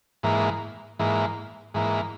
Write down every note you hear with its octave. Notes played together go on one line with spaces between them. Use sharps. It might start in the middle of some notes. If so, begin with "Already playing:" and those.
G#2 E3 A#3
G#2 E3 A#3
G#2 E3 A#3